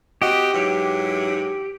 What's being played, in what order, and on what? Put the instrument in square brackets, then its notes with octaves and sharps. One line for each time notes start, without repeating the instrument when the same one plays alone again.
[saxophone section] C4 F#4 D#5 [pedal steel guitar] G4
[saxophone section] G#2 E3 F#3